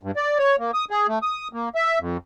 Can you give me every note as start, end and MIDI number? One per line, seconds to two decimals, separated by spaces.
0.03 0.11 43
0.16 0.38 74
0.38 0.56 73
0.59 0.71 58
0.74 0.85 87
0.91 1.07 68
1.08 1.19 57
1.22 1.48 87
1.53 1.69 58
1.75 1.99 76
1.99 2.17 41